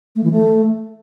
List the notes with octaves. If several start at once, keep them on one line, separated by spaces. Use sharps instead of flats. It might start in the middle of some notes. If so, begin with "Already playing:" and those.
A3
E3
A3